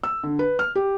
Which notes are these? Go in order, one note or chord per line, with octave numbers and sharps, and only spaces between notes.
E6
D3
B4
F6
G4